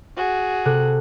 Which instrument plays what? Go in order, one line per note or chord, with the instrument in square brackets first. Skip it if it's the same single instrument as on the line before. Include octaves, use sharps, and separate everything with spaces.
[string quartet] F#4 G#4
[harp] C3 A4 F#6